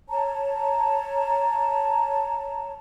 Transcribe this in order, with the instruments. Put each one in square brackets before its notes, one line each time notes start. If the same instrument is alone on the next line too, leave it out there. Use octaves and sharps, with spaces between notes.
[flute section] C#5 A5 A#5